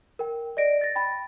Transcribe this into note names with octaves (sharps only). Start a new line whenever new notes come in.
A#4 G5
D5 D#5 A#6 D7
A6 A#6
G5 B5 A6